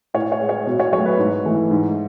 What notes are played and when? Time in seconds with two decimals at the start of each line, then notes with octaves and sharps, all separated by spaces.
0.14 A2 C#5
0.32 C#5
0.40 G#3
0.49 C#5
0.67 B2
0.80 C#5
0.92 F#3 C#5
0.97 A3
1.06 B4
1.19 G#2
1.45 E3 A3
1.71 G#2